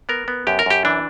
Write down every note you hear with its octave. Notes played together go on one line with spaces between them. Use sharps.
B3 A#4
B3
F#2 G4
A#4
F#2 G4
E3 D4